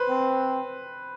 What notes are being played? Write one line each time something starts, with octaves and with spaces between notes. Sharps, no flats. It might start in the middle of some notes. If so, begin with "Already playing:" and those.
Already playing: B4 C5
C4